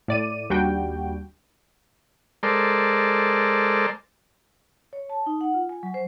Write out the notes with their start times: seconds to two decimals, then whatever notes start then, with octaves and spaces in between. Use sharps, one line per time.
0.08 A2 D5 D#7
0.50 D#2 G3 D4 F#4 G5
2.43 G#3 A4 A#4 C5 D5
4.93 C#5
5.09 A5
5.26 D#4
5.41 F#5
5.54 F4
5.69 G#5
5.83 F#3
5.94 C5